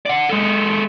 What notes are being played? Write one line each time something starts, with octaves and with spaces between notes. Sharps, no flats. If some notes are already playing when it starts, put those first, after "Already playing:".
D5 F#5
G#3 A4